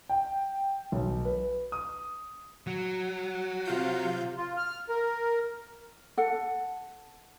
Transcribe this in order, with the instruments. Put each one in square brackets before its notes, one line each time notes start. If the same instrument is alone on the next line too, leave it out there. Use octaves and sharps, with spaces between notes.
[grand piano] G5
B1
B4
D#6
[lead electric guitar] F#3
[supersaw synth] C3 F5 G6 [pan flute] F4
[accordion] F4
F6
A#4
[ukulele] A4 F#5